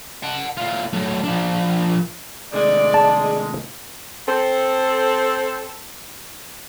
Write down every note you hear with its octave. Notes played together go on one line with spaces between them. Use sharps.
F#5 A5
A2 F4
F#3 A3
F3 D4
C3 D#3 G#3 A3 D5
A5
C4 A4